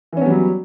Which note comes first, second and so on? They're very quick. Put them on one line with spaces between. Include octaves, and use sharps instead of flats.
E3 C#4 B3 G3 F#3